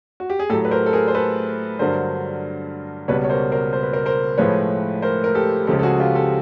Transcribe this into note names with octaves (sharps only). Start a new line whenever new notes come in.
F#4
G4
G#4
A2 F#3 G4 A4
B4
A#4 C5
A4
G#4 A#4
C5
A4 B4
G2 D3 F#3 A#4 C5
C#2 B2 G3 B4 C#5
C#5
A#4 C5
A#4 C5
C5
B4
A#4 C5
A#4 C5
A2 F3 G#3 B4 C#5
A#4 C5
A#4
G4 A4
C#2 C#3 F3 G#3 G4 A4
A4
F#4 G#4
F4 G4
G4 A4